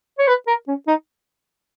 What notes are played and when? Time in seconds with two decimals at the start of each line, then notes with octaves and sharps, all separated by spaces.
0.19 C#5
0.27 B4
0.47 A#4
0.68 C#4
0.88 D#4